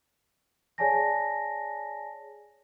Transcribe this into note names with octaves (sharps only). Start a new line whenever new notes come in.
G#4 C#5 D5 G#5 A5 A#6